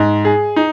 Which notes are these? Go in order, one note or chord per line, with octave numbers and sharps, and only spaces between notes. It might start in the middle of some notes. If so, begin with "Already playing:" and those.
Already playing: G#2
G#4
D#4